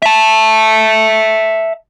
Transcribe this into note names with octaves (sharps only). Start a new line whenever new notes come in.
E5 A5